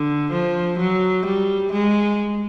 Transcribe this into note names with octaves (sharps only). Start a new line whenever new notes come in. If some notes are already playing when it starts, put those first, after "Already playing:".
Already playing: D3
F3
F#3
G3
G#3